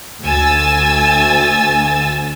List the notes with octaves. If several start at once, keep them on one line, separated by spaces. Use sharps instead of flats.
D2 G#5 E6 A6